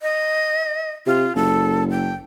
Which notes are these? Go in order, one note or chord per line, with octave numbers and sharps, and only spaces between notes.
D#5
C3 F4
F#1 A4
G5